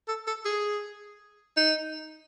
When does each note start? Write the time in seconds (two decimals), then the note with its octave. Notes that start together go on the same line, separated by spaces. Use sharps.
0.08 A4
0.27 A4
0.45 G#4
1.57 D#4